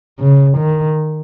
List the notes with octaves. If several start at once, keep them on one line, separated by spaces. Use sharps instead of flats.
C#3
D#3